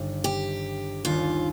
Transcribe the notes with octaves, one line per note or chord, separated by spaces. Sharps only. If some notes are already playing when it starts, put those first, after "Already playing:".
Already playing: G1 G2 D#3
G4
D#2 D#3 G3 D4 F4